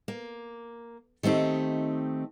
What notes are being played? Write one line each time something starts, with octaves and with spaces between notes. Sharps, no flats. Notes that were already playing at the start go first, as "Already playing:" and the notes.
A#3
D#3 A3 C4 D#4 G4